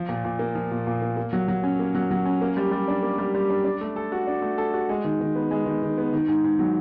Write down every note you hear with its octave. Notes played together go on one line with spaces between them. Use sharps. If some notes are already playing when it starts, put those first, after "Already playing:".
Already playing: F3
A#2
A#2
A#3
F3
A#2
A#2
A#3
A#3
F#3
F#3
C#4
A#3
F#3
F#3
C#4
A#3
G3
G3
D4
A#3
G3
G3
D4
D4
A3
A4
F#4
D4
A3
A4
F#4
G#3
D#3
D#3
B3
G#3
D#3
D#3
B3
D#3
G#2
G#2
F#3